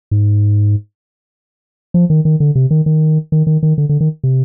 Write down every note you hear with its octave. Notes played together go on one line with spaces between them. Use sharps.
G#2
F3
D#3
D#3
D3
C3
D#3
D#3
D#3
D#3
D#3
D3
D3
D#3
C3